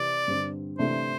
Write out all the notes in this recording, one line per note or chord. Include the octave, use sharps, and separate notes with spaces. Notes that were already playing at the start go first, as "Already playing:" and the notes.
Already playing: C3 E3 C4 G4 D5
G2 D3 C4
C3 E3 A3 D4 C5